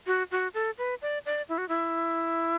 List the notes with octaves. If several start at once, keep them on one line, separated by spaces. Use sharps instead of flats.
F#4
F#4
A4
B4
D5
D5
E4
F#4
E4